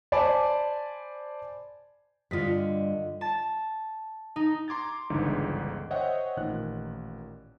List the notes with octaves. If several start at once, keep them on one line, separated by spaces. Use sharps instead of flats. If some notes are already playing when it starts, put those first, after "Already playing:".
C5 D5 G#5 A5 B5 D6
G2 D3 F4 D#5 B6
A5
D#4
A#5 C6 D6 G#6 A6
G1 C#2 G#2 D3 E3
C5 C#5 D#5 E5 F#5 G5
A1 A#2 D#3 F#6